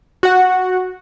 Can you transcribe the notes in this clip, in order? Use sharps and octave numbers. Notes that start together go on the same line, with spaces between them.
F#4 F#5